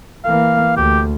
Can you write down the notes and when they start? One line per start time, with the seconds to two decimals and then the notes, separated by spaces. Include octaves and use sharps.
0.25 E3 A#3 F5
0.77 D2 G4